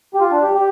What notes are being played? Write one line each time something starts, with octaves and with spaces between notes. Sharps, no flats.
G4
F4
D4
G4
G4